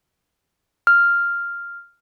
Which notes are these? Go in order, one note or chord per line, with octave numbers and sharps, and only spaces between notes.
F6